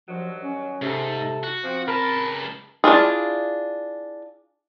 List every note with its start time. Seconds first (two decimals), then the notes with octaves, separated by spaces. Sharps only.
0.09 G2 D#3 F3 F#3
0.42 C#4
0.82 G#2 C3 A4
1.43 F#4
1.63 F3 C4
1.88 C#2 A#4 A5 B5
2.84 D4 E4 F4 G#4